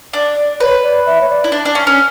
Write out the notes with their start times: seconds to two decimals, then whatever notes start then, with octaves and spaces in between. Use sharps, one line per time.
0.13 D4 D5
0.60 B4 C#5
0.83 D5
1.06 E5
1.21 C#5
1.29 D5
1.44 E4
1.52 D4
1.65 D4
1.75 C#4
1.87 C#4